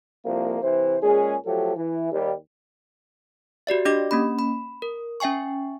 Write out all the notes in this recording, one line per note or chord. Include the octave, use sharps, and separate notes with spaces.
C2 F2 F3 A#3
C3 E3 C5
A#2 G#3 C#4 G#4
F3 F#3 A3 G4 A4
E3
D#2 G3
F#4 G4 D5 E5
D4 G4 D#5 D6 A#6
A#3 C#4 B5
B5
A#4
C#4 E5 G5 G#5 C#6